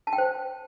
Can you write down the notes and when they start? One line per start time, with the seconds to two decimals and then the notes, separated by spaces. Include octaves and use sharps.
0.07 A5
0.13 G5
0.18 C5